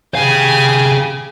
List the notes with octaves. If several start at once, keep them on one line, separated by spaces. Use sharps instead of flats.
G4 G#4 F5 G#5